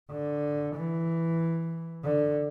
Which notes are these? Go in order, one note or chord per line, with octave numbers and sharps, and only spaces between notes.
D3
E3
D3